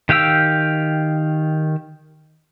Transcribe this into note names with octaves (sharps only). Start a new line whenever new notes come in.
D#3 G4 F5 G5 E6